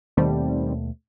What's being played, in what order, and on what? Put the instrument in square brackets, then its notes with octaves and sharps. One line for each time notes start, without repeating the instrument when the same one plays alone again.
[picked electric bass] D#2 B2 A3 [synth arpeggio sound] D#3 G3 C4